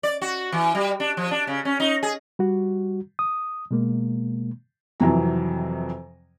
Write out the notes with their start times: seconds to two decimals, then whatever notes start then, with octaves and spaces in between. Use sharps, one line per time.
0.03 D5
0.21 F#4
0.52 E3
0.75 G3
1.00 D4
1.17 F3
1.31 D4
1.47 C#3
1.65 C#4
1.80 D#4
2.03 G#4
2.39 G3 F#4
3.19 D#6
3.71 B2 G#3 A#3
5.00 F2 C3 E3 F#3 A#5